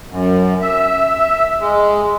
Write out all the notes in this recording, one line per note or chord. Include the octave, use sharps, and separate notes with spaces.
F#2
E5
G#3